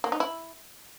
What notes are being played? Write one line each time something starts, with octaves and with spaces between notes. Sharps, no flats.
A#3
D#4
E4